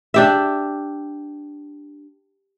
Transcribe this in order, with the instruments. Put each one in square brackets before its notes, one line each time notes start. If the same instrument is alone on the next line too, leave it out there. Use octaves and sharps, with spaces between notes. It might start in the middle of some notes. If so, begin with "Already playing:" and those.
[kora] D4 G4 E5